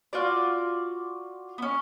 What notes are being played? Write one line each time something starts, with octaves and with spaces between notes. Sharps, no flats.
F4 F#4 D5
B3 C#4